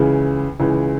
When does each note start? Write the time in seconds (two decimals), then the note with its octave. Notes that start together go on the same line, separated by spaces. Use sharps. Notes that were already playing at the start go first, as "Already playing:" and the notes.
Already playing: C#2 C#3 E3
0.59 C#2 C#3 E3